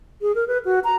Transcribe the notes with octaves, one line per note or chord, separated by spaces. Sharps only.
G#4
A#4
B4
F#4
A#5